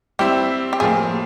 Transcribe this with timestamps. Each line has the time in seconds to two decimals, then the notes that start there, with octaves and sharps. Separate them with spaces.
0.19 G3 C4 E4 G4
0.73 G4
0.80 A2 F3 A#3 G#4